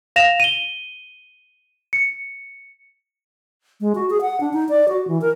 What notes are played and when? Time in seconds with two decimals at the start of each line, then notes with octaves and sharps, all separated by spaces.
0.16 F5 A#6 E7 F7
0.40 D#7 G7
1.93 C#7
3.81 G#3
3.95 F#4
4.10 G#4
4.22 F#5
4.40 D4
4.53 D#4
4.69 D5
4.89 F#4
5.08 E3
5.21 A#4